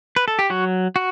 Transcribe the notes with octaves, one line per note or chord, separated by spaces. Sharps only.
B4
A4
G4
F#3 F#4
F#4